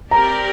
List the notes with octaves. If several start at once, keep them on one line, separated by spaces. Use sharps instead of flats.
C4 G4 A#4 D5 A#5